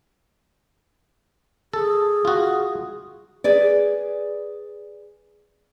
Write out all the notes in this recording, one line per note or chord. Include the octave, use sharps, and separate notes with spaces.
G#4 A4
F4 F#4
G#4 B4 D5